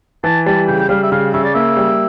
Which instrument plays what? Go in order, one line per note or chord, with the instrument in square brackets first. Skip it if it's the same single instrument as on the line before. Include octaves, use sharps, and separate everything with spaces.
[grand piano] E3 [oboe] A5
[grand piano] G3 [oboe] A5
[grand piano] C#3 [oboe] G5
[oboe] G5
[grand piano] G3 [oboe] F5
[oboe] E5
[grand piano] C#3 [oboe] F5
[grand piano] C#3 [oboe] E5
[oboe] D5
[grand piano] A#3 [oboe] E5
[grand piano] G3